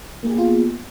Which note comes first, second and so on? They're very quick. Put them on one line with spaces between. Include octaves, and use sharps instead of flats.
A#3 G#4 G4 B3 F4